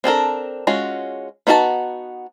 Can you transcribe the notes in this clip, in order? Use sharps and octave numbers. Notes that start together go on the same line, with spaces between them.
C4 D4 A4 A#4
G#3 C#4 F4 F#4
B3 D#4 F#4 A4 A5